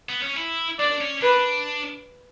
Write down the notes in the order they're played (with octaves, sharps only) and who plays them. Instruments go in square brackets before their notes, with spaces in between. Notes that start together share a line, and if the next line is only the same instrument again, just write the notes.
[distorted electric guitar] B3
C#4
E4
[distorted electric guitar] D4 [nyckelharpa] D5
[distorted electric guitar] C#4
[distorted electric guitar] D4 [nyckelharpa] B4